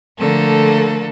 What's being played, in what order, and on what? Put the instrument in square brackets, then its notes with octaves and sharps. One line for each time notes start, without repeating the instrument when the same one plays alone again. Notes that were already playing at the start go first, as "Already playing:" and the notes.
[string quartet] D3 F3 A3 A#3 A4